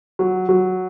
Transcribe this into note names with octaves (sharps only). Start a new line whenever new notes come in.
F#3
F#3